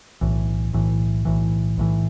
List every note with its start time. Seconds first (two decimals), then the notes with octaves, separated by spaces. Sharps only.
0.21 B1 A2 E3
0.73 B1 A2 E3
1.25 B1 A2 E3
1.77 B1 A2 E3